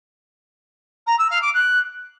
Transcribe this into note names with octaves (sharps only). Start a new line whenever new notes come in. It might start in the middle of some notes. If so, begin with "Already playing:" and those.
A#5
E6
F5
D6
F#6